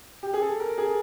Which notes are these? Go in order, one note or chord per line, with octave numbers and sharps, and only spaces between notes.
G4
G#4
A4
A#4
G#4